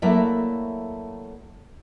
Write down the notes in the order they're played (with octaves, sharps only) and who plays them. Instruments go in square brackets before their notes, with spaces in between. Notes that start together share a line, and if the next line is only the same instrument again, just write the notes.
[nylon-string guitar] F#3 A3 A#3 E4 D5 E5